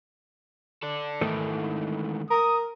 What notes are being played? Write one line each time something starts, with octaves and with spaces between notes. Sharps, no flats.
A4 D5
G#2 D#3 E3 A3
A#4 D#6